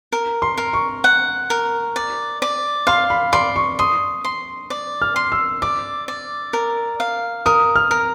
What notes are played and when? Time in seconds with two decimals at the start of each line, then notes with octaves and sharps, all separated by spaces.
0.12 A#4
0.42 C6
0.58 A#4
0.73 C#6
1.04 F#5
1.50 A#4
1.96 D5
2.42 D5
2.87 F5 C6
3.10 B5
3.33 D5 C6
3.56 C#6
3.79 C6 D#6
4.24 C6
4.70 D5
5.02 F6
5.16 C6
5.32 E6
5.62 D5 D6
6.08 D5
6.53 A#4
7.00 F5
7.46 A#4 D#6
7.76 F6
7.91 A#4